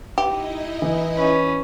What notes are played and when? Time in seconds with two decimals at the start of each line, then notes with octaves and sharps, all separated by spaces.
0.18 D#4 E4 G4 D#5
0.82 E3
1.16 C#4 B4